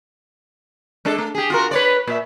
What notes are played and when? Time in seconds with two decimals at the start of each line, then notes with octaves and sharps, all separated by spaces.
1.05 G#3 D4 A4
1.18 A3
1.35 G4 G#4
1.50 F4 F#4 A#4
1.71 B4 C#5 D5
2.07 A#2 E5